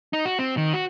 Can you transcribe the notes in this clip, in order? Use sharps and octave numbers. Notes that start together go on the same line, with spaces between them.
D#4
F#4
C4
D#3
F#4